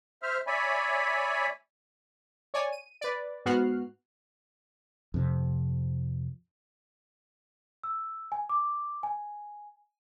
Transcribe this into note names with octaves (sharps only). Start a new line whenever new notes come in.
C5 E5 F6
C#5 D5 E5 G#5 B5
C#5 D5 G#5
D#7
B4 D5
G#2 B3 F#4 F6 F#6 C7
F2 C3
E6
G#5
D6
G#5